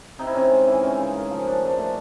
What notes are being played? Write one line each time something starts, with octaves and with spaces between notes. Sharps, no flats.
C3 D#4
E4
C3 C#4 D#4
G#3
E3
C#4
C#3
A#3
F3
C#4 D4
G#2
D4
A3